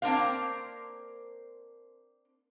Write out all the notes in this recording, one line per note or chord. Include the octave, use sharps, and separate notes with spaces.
A#3 C4 D4 A#4 C5 F5